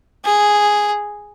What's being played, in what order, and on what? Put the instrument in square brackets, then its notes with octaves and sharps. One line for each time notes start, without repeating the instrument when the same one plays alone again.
[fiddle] G#4